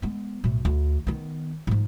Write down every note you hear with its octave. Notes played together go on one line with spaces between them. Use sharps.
G#3 B3
B1 A2
D2
D#3 B3
G#2 F3